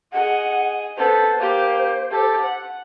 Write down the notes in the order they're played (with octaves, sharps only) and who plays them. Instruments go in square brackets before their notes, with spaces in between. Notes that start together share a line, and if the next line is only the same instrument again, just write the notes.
[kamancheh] G#4 D#5 [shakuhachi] F#5
[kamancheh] B3 A4 [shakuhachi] C5
[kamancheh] A#3 G4
G4 A4
F#5